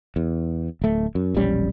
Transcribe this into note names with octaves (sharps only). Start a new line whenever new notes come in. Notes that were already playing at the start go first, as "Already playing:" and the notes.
E2
D1 A3
F#2
E1 A#1 G3 C#4